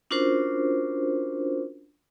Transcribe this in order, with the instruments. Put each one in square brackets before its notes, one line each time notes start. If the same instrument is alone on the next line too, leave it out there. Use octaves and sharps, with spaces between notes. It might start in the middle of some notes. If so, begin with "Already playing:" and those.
[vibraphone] C#4 D4 F4 F#4 A#4 C5